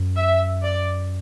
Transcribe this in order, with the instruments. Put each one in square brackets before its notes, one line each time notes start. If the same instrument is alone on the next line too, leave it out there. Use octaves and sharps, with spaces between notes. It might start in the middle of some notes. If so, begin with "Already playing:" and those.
Already playing: [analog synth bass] F#2
[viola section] E5
D5